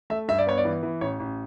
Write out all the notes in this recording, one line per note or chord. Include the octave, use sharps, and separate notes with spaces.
A3 E5
G2 E5
D5
B3 C#5
D5
E3
E3
A1 C#5
A1